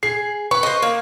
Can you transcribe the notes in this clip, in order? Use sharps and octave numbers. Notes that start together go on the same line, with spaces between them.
G#4 C7
B4 C#6
C5 D#5
A#3